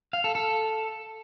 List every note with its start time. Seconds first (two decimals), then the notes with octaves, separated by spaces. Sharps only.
0.13 F5
0.24 A4
0.35 A4